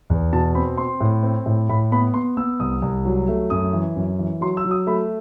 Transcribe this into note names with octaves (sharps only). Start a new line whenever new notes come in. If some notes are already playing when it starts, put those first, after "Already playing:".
E2
B2 A5
C4 B5
C4 C6
A2
C4
A2
A2 B5
B3 B5
B3 C6
B3 E6
C2 D#6
C2
F#3
A3
F#2 D#6
E3
F#2
E3
F#3 C6
E6
F#3
D#6
A3 B5